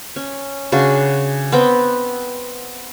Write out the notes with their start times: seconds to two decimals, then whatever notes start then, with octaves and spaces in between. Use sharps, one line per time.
0.16 C#4
0.72 C#3 D4 F#4
1.52 B3 C4 G5